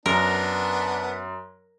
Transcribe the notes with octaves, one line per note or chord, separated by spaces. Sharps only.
F#2 B3 D4 A#4